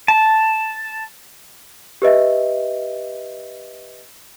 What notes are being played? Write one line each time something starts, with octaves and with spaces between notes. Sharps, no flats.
A5
G4 B4 D#5 E5